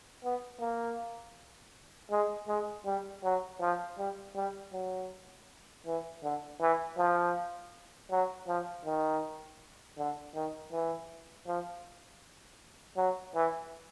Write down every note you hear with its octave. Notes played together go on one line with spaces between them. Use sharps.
B3
A#3
G#3
G#3
G3
F#3
F3
G3
G3
F#3
E3
D3
E3
F3
F#3
F3
D#3
D3
D#3
E3
F3
F#3
E3